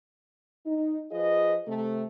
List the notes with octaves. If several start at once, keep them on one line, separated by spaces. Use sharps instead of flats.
D#4
F3 F4 G#4 B4 D#5
C3 A3